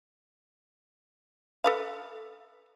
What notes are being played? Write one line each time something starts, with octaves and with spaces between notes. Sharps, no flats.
A4 B4 F5